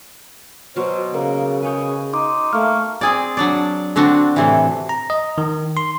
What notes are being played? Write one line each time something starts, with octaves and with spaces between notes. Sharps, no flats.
B2 F#3 C5 F5
C#3 A#3 A#4 F#5
G#4 B4 C#5 G5
D#4 C6 D6
A3 A#3 C#6 F6
C4 G#4 D5
F#3 D4 D5
D3 C4 D4 F#4
A2 C3 E3
A#5
D#5
D#3
C6